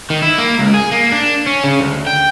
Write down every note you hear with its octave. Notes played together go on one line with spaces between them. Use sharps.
D#3
E4
A#3
C#2
G#4
A#3
D4
C#4
C#3
D2
G5